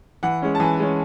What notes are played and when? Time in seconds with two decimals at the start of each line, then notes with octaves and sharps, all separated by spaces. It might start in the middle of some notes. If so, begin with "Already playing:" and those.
0.23 E3 F#5
0.42 G#3 C#4
0.55 A5
0.60 E3 G#5
0.79 G#3 C#4